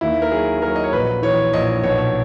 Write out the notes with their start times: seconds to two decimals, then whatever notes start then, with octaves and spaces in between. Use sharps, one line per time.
0.01 D#2 E4
0.22 A#4
0.32 F#3 G#4
0.62 F#3 A#4
0.76 D#5
0.84 C#5
0.92 A#1 B4
1.23 E3 C#5
1.53 A#1 D#5
1.83 B1 C#5